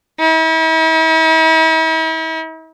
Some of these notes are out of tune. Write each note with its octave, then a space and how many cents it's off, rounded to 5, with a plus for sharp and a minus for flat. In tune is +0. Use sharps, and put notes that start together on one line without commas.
E4 -45